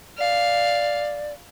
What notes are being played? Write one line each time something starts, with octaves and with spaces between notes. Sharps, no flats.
D5 F5